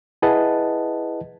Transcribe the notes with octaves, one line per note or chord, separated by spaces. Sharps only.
E4 G#4 B4 D#5 F#5 A5